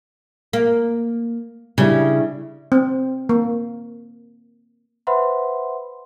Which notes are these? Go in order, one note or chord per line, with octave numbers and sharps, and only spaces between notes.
A#3
C#3 G3 D4 E4
C4
A#3
B4 C5 E5 F#5 B5 C6